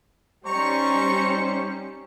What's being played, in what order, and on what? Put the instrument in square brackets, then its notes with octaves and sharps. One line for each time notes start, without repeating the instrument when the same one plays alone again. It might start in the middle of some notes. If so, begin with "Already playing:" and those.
[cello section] G3 C#4 [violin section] D#4 G4 C#7 [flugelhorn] C5 [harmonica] A#5 C#6